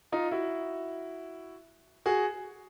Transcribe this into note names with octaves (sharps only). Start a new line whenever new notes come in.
D#4 F4
E4 F#4
F#4 G#4